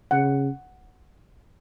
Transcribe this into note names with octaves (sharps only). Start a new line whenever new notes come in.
C#3 F#5